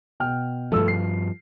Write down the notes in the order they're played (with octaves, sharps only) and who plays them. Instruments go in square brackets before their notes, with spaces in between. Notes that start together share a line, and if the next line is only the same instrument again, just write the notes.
[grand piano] B2 G5 F6
[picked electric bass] G2 F3 [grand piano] A3 A4 E6
[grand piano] C7